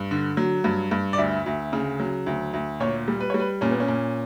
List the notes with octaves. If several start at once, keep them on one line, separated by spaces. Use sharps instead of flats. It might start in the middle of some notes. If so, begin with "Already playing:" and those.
Already playing: G2
D3
F#3
G2
G2
D5
D2 E5
D2
C#3
F#3
D2
D2
A#2 C#5
G3
B4
C#5
G3
B4
A#2 C#4
B3
C#4
A#2